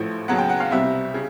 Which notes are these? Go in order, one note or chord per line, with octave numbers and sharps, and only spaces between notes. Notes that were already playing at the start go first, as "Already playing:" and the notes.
Already playing: A1 A2 F3 A3
D#2 C#3 F#3 B3 F#5
G5
F#5
F5
C2 B2 G3 C4 E5
C#3